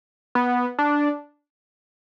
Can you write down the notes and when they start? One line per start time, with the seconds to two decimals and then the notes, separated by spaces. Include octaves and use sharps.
0.35 B3
0.79 D4